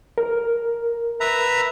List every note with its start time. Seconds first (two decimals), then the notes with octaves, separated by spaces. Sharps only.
0.18 A#4
1.20 B4 E5 A#5